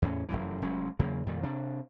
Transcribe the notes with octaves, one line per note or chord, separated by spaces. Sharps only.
E2 A2 B3 C#4
F1 C#2 F#2 E3
F1 F#3 G#3 C#4
E2 C#3 F#3 A#3
F2 A#2 D#3 G3
C3 D4